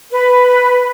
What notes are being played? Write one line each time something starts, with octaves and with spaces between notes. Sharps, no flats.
B4